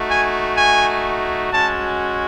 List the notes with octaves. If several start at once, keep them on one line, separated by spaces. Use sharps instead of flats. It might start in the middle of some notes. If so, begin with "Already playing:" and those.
Already playing: A3 D#4 F#4
G#5
G#5
G#3 C#4 F#4 A5